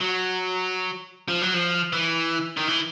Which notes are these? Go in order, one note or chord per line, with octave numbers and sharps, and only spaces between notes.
F#3
F3
F#3
F3
E3
D#3
E3